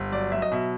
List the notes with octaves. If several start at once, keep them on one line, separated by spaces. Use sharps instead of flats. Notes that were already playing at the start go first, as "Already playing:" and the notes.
Already playing: G1
F#3 D5
F#3 E5
D#5
B2 E5